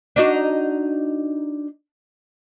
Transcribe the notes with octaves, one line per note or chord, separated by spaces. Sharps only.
D4 D#4 F#4